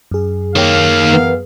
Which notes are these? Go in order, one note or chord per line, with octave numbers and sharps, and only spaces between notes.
F#2 G#4
D#3 A#3 C#5 F5 G5
E3 B3 A#4